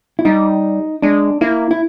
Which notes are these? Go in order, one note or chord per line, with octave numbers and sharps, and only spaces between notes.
E4
G3 D#4
G#3 D4
A#3 E4
E4